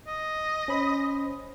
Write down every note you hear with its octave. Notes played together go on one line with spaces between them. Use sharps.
D#5
C#4 C5 B5